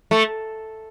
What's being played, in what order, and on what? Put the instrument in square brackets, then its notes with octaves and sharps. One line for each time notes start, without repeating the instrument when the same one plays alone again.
[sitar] A3